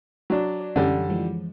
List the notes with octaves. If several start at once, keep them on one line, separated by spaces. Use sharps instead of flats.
F#3 D4
D5
F#2 D3 E3 G3 C#4
E3 F3 G#3